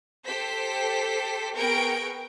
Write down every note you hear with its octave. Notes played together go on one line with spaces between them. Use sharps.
G4 A4 C5 B6
B3 G#4 A#4 G5 C#6 D7